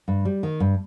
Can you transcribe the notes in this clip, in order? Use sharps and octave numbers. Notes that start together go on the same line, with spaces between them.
G2
G3
D#3
G2